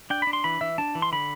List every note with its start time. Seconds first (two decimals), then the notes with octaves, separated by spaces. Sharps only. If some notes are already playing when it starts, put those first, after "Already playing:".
0.10 D4 G5
0.22 D4 B5
0.33 C6
0.44 E3 B5
0.61 E3 E5
0.78 D4 A5
0.95 E3
1.02 C6
1.12 D3 B5